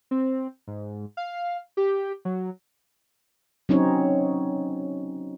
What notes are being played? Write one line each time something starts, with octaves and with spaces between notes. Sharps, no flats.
C4
G#2
F5
G4
F#3
F#3 C4 C#4 D#4 C#5